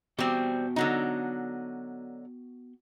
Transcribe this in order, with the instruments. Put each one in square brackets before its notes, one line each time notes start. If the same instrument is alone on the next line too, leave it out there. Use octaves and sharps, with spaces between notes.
[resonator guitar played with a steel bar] G3 C4 [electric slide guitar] B3 F#4 G5
[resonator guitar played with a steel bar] D3 F#3 D#4